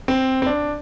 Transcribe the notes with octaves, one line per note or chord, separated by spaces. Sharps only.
C4
C4
D4